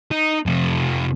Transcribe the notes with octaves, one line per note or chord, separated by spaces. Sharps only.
D#4
F2 C3